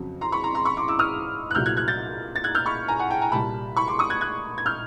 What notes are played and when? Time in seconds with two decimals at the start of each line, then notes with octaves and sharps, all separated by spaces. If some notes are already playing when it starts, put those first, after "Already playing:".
Already playing: F2 C#3 F#3
0.21 A#5 C6
0.32 B5 C#6
0.44 A#5 C6
0.54 A#5 C6
0.65 B5 C#6
0.77 C6 D6
0.88 D6 E6
0.99 D#6 F6
1.51 F#6
1.55 C2 A#2 F#3 F6 G6
1.66 F#6 G#6
1.77 F#6 G#6
1.88 G6 A6
2.36 A6
2.44 F#6 G#6
2.55 F6 G6
2.66 B5 C#6
2.88 G#5 A#5
2.99 F#5 G#5
3.10 G5 A5
3.21 G#5 A#5
3.32 C2 A#2 G3 A5 B5
3.77 B5 C#6
3.88 C6 D6
3.99 C#6 D#6
4.10 F#6 G#6
4.21 F#6 G#6
4.58 G#6
4.66 F6 G6